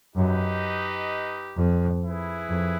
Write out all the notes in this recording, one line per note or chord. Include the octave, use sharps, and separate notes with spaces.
F#2 D#4 G4 B4 D#5
F2
E4 G#4 B4
F2